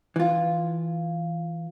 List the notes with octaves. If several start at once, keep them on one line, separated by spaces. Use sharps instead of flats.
E3 F4